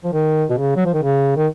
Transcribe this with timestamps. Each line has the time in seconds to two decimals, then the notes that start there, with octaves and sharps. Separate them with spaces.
0.04 F3
0.13 D#3
0.50 B2
0.58 C#3
0.76 F#3
0.86 F3
0.94 D#3
1.02 C#3
1.36 D#3